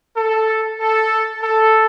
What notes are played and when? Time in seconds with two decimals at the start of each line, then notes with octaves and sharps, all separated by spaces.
0.17 A4
0.80 A4
1.42 A4